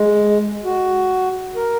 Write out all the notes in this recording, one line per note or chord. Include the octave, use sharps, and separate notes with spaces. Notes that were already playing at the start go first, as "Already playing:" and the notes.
Already playing: G#3
F#4
A#4